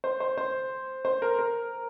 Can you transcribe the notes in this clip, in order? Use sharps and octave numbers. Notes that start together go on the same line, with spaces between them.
C5
C5
C5
C5
A#4
A#4